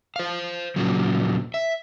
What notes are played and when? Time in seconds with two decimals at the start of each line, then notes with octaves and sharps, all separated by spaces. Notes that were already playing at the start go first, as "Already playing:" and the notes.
0.16 C5 F5
0.76 A#2 C#3 F3 F#3
1.54 E5